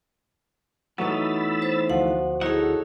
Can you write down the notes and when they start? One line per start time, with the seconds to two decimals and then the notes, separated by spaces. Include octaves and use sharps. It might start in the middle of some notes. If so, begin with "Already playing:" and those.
0.98 E3 F#3 A3 B3 D#4 B5 E6 A6
1.62 C5
1.90 D2 F3 F#4 F#5
2.41 D#4 E4 G#4 A4 C#5 F#5